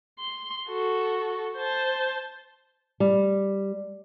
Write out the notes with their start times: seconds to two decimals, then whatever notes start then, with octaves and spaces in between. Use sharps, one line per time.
0.19 C6
0.68 F#4 A4
1.57 C5 A5
3.00 G3